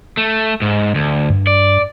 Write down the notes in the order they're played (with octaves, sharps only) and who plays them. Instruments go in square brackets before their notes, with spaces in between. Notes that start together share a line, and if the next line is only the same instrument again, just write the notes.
[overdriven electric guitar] A3
G#2
D2
[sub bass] G2
[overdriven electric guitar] D5